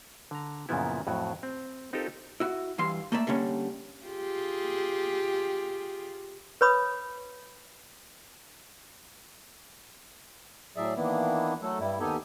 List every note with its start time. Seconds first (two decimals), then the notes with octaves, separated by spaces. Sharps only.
0.31 D3 A#5
0.69 F#2 A#2 C#3 F3 B3 E4
1.07 F2 A2 F#3
1.43 C4
1.93 C4 D#4 F4 G4 A4 A#4
2.40 E4 F#4
2.78 G2 E3 F5 C6
3.12 A3 A#3 D5 E5
3.27 D3 G3 A#3 C#4
4.06 F4 G4 G#4
6.61 B4 C#5 B5 D#6
10.76 A2 F#3 G#4 D5 E5
10.96 D#3 E3 A#3 B3 D4 E4
11.62 F#3 A3 A4
11.79 G2 G3 E4
12.00 D#2 B3 D#4 G4 A4 G#5